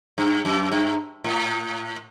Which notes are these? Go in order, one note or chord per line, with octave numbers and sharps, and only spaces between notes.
G2
F#2
G2
A2